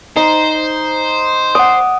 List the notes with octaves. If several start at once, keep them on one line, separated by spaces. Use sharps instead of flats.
D#4 C5
F#5 D6 D#6